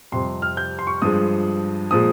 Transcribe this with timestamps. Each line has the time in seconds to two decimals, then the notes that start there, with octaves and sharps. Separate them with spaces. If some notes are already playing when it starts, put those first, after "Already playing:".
0.12 F2 C3 G3 C6
0.42 F6
0.57 G6
0.79 C6
0.87 C#6
1.02 G2 F3 G#3 D#6
1.91 A#2 F3 G#3 D#6